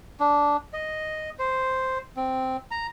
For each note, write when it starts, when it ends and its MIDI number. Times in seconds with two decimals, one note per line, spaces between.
0.20 0.57 62
0.73 1.30 75
1.39 1.98 72
2.16 2.57 60
2.71 2.87 82